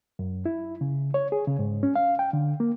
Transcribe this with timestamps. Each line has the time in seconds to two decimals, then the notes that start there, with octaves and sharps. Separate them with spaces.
0.19 F#2
0.46 E4
0.81 C#3
1.14 C#5
1.32 G#4
1.47 C#3
1.59 G#2
1.83 C#4
1.96 F5
2.19 G5
2.33 D3
2.60 A#3